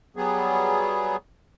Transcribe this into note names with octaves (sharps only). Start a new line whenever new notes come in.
F#3 G3 B3 G#4